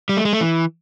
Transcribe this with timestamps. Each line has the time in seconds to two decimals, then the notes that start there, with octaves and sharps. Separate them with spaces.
0.09 G3
0.17 A3
0.25 G#3
0.33 A3
0.41 E3